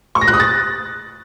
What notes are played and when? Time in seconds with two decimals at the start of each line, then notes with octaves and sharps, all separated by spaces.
0.15 C#6
0.21 A#6
0.28 F#6
0.34 D#6
0.40 A6